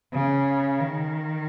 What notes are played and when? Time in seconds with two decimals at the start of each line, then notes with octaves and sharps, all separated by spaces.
0.13 C#3
0.80 D#3